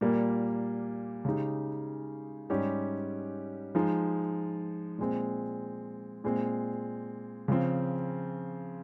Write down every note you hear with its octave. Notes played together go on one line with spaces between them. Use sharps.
A#2 G3 A#3
C#3 G#3 D#4 G4
G#2 G3 C#4 G4
F3 G#3 D#4
A#2 G#3 C4
A#2 G#3 C4
C#3 F3 C4